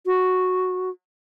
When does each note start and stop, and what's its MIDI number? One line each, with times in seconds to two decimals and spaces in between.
0.06 0.90 66